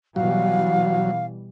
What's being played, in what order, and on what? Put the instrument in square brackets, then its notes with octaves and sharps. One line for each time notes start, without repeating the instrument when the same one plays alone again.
[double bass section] B2 E3 G3 [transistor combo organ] F#3 [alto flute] F5